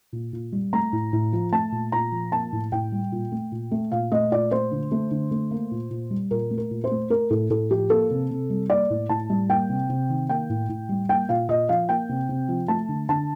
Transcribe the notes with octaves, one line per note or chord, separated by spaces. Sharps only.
A#2
A#2
G3
A3 A#5
A2
A2
F3
A3 A5
A#2
A#2 A#5
F3
A#3 A5
A2
A2 G5
G3
A#2
A3
A#2
A3
A#2 F5
A3 D#5
A#2 D5
A3 C5
D3
A3
D3
A3
A#3
A#2
A#2
G3
A#2 A#4
A3
A#4
A#2
C5
A3
A3 A#4
A2 A4
A2 A4
F3 G4
A#3 A4
C3
C3
G3
A#3 D5
A2
A2 A5
G3
A#3 G5
C3
C3
D#3
A#3 G5
A2
A2
G3
A#3 G5
A#2 F5
A#2 D#5
F3 F5
A#3 G5
C3
C3
F3
A3 A5
D3
D3 A5